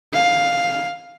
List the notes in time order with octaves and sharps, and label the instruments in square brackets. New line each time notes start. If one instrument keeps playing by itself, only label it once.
[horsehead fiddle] F5